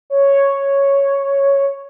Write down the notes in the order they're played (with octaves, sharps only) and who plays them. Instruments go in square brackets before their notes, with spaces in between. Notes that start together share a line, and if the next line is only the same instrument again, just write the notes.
[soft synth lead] C#5